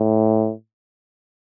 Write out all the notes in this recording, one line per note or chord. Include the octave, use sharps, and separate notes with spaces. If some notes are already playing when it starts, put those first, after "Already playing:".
Already playing: A2